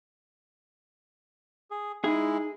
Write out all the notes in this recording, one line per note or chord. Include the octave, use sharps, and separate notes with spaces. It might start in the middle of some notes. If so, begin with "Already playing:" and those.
G#4
G#3 D#4 E4 G#4